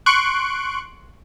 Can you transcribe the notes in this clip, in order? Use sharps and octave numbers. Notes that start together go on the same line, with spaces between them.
C6 C#6 F#6 D7